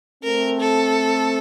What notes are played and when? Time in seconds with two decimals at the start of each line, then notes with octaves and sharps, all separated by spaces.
0.23 A3 C4 A#4
0.61 A4